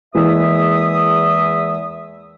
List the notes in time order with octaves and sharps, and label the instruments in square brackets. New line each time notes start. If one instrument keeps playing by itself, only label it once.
[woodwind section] E2 E5 D#6 [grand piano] E3 G#3 A#3